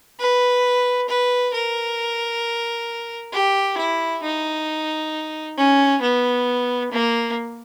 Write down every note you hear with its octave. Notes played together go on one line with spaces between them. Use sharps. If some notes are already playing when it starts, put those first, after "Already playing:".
B4
B4
A#4
G4
E4
D#4
C#4
B3
A#3